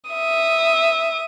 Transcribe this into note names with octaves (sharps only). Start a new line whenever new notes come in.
E5 D#6